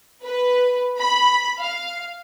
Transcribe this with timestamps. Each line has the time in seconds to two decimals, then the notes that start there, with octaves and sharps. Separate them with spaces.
0.25 B4
0.98 B5
1.59 F5